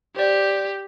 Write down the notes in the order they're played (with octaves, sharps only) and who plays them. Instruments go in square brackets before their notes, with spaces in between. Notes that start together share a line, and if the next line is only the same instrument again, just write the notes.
[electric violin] G4 [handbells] C5 D5